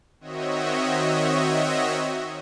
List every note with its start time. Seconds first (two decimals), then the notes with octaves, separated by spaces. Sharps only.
0.20 D#3 C4 F#4 C#5 D#5 E5